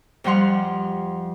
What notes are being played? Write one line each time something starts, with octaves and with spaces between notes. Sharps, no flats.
F2 F3 G3 F#5 C6 F6